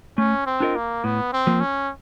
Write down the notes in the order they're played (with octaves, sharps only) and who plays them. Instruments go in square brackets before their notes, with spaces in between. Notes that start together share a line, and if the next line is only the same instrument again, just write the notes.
[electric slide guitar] A3 [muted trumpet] C#4
[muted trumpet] C4
[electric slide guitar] D4 F4 A#4 D#5
[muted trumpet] A#3
[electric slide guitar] A2 [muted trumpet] B3
[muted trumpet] C4
[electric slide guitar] F3 A#3
[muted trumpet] C#4